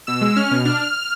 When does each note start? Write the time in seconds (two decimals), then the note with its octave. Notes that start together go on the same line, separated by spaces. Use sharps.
0.07 B2 E6
0.21 G#3
0.36 C#4 F6
0.51 B2
0.65 D4 F6